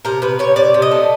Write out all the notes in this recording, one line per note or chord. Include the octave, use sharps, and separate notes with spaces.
C3 A#4
C3 B4
C3 C#5
C3 D5
C3
D#5
A3